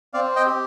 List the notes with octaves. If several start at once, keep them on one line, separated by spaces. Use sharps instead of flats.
C4 D5 F5
D#5 G5
G4